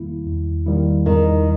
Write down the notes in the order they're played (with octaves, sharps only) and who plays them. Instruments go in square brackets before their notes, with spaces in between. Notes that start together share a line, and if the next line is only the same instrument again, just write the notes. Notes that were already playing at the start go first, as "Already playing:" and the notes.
Already playing: [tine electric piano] E2 D#3 G3 A#3 E4
E2
D#3 G3 A#3 E4
[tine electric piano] E2 [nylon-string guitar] D#3